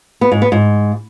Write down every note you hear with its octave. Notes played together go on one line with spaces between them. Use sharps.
B3
G#2
B3
G#2